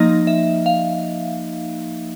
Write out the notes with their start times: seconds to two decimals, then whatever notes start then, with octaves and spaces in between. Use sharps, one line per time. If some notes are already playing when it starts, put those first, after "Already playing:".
Already playing: F3 A#3 D#4 D#5
0.27 E5
0.66 F5